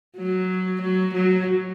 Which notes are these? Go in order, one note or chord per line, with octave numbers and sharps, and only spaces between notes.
F#3
F#3
F#3